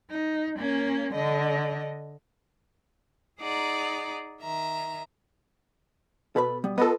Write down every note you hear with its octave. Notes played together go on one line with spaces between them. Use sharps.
D#4
A#3 C#4
D3 D#5
D#4 G#4 D5 F#5 A#5
D#3 E5 A#5
B2 A4 B4 B5
G3 B3
B3 F4 A4 A#4 D#5